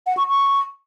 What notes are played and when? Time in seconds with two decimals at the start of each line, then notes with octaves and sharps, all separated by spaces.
0.07 F#5
0.17 C#6
0.28 C#6